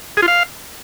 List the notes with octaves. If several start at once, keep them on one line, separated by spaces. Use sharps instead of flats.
G#4
F4
F5